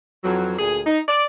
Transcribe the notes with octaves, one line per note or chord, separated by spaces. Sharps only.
F2 E3 F#3
D2 A#2 G#4
D#4
D5